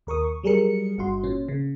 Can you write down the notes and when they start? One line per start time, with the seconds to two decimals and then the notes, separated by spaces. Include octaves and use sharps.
0.07 D#2 A#4 C#6 D#6
0.24 C#6
0.43 F#3 G3 G#4 A#4 C#7
0.98 G1 G2 F#4 C6
1.24 A#2 C#4
1.49 C#3